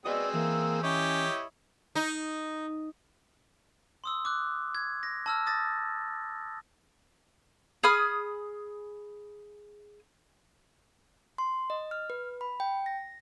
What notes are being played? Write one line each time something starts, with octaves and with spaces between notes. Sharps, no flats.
G#3 C4 F#4 B4 D5 D#5 E6
E3 A#3
C#4 E4 G4 C#5 D#5
D#4
C6 D#6 E6
D6 F#6
G#6
A#6
A5 E6 F6
D#6 A6 A#6
G#4 B5 D#6 F6
C6
D#5
F6
B4
B5
G5
A#6